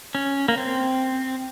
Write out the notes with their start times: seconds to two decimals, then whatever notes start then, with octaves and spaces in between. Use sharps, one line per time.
0.15 C#4
0.48 A#3
0.58 C4